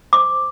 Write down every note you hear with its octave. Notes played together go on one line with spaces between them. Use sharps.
C5 D6